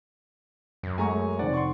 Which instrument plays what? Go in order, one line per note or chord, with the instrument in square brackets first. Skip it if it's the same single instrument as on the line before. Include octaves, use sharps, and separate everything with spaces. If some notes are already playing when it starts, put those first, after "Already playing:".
[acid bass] F#2
[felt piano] G#3 A3 [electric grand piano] G#5 A#5 C#6
[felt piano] F1 D#3 C5 [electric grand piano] D5 F#5
[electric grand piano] C6 C#6